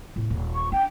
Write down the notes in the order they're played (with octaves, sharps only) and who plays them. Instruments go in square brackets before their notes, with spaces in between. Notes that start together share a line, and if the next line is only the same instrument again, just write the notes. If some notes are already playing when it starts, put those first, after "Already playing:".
[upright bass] E2 A2
D#1
[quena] C#6
[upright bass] D4 [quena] G5